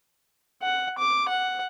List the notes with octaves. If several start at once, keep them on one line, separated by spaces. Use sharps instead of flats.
F#5
D6
F#5